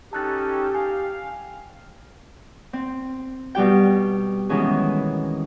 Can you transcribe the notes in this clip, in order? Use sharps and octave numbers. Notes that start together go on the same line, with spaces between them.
C#4 D#4 G4 A4 A5 F#6 A6
F5 G#5
C4
B2 G3 G4 G5
B2 D#3 E3 G#3 C#4 G#4